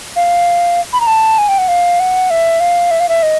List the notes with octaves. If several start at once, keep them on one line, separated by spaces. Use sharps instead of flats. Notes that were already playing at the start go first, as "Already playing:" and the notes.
F5
B5
A#5
A5
G#5
G5
F#5
F5
F#5
E5
F5
E5
F5
E5
D#5